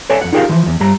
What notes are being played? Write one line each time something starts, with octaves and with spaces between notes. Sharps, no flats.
A4 C#5 D5 E5 G#5
F2 F#5
D#4 F4 G4 G#4 A#4 F5
E3 F3
E2
G2 G3 A#5